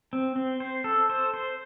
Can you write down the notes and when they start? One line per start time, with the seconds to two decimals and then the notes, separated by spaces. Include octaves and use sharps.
0.13 C4
0.36 C4
0.60 C5
0.84 A4
1.10 C5
1.34 C5